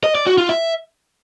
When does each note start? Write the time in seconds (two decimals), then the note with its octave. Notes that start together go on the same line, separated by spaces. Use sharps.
0.04 D#5
0.15 D5
0.27 F#4
0.38 F4
0.49 E5